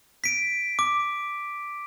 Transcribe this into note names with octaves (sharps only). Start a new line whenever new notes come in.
B6 D7
D6